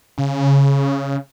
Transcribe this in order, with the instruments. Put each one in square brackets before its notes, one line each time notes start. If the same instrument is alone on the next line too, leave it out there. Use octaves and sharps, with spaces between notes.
[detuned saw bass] C#3